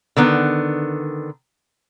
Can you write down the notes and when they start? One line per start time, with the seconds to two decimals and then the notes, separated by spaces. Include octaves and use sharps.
0.17 D3 D#3 B3